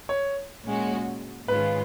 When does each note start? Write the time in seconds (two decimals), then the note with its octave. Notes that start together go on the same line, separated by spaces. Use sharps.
0.09 C#5
0.65 A#2 G#3 C#4 F#4
1.48 G#2 D#3 G#3 C#4 F4 B4